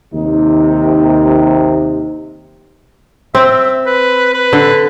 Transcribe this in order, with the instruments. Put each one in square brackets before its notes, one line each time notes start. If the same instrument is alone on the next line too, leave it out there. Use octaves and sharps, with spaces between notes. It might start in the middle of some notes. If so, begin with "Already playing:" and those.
[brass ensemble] D#2 C3 D#4
[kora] C4 [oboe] E5
[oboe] B4
B4
[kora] D3